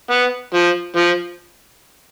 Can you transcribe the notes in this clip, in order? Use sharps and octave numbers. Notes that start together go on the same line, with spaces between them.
B3
F3
F3